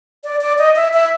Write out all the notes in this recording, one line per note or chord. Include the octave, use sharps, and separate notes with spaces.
D5
D5
D#5
E5
E5